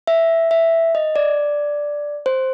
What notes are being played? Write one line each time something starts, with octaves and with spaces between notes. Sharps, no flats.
E5
E5
D#5
D5
C5